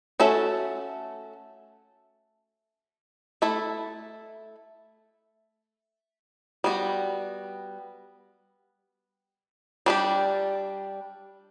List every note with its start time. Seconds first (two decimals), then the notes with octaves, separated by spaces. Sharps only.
0.20 A3 C#4 F#4 A4 E5
3.42 A3 E4 A4
6.64 G3 B3 F#4
9.86 G3 D4 G4